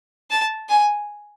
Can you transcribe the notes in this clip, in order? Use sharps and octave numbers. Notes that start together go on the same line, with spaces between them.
A5
G#5